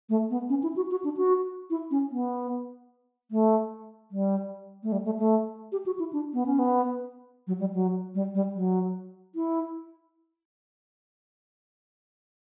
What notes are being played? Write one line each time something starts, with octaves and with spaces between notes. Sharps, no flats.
A3
B3
C#4
E4
F#4
F#4
D4
F#4
E4
C#4
B3
A3
G3
A3
G3
A3
A3
G4
F#4
E4
D4
B3
C#4
B3
F#3
G3
F#3
G3
G3
F#3
E4